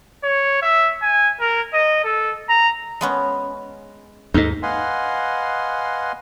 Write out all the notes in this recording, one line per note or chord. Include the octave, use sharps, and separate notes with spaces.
C#5
E5
G#5
A#4
D#5
A4
A#5
G#3 B3 C#4
D#2 G#2 D#4 A4 D#5
B4 D#5 F5 F#5 G#5 C6